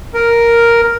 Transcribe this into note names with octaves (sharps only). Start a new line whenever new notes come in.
A#4